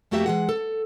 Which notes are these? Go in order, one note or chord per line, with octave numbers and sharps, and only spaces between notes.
F2 A3 A#3 F#4 G4 E5
E3 G#3 F#5
A4